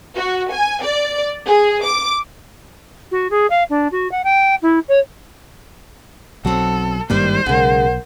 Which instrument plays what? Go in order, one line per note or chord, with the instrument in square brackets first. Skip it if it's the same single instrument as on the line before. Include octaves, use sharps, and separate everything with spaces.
[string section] F#4
G#5
D5
G#4
D6
[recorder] F#4
G#4
F5
D4
F#4
F#5
G5
E4
C#5
[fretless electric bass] B1 F#3 [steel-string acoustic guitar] C4 F#5 [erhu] A4
[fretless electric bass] G#1 G2 A#3 [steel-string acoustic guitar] D#3 G3 E4 [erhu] C5
[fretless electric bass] B1 [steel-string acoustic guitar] C#3 G#3 [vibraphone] A#4 F#5